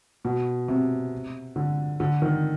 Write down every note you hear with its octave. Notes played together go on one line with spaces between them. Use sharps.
B2
C3
D3
D3
D#3